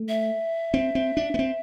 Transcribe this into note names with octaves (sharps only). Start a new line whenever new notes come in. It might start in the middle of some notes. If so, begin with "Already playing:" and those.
Already playing: A3
E5
C4
C4
D4
B3
C4